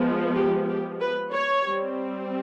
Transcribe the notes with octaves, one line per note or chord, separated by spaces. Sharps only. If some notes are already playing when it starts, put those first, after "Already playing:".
Already playing: F3 G#3 B3
G4
G4
B4
C#5
G3 C4